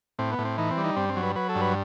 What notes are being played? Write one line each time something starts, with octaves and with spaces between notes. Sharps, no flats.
A2 C4
B3
A2
C4
E3 D#4
C4
G3
D#4
G2 C4
C4
F#3
B4
F#3 B4
A4
G2
B4